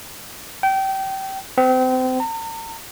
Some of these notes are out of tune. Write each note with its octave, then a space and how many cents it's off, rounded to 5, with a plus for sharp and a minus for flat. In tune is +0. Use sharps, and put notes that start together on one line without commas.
G5 -25
C4 -30
A#5 -45